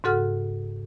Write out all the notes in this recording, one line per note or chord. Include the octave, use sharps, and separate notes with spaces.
G#2 C#3 F#4 A4 F#5 F6